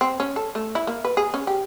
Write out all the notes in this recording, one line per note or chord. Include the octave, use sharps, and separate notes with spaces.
C4
C#4
A4
A3
E4
A#3
B4
G#4
C#4
G4